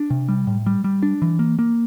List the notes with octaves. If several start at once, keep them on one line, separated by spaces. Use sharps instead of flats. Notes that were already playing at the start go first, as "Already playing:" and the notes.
Already playing: D4
C3
G3
A2
G3
G3
D4
E3
A#3
A#3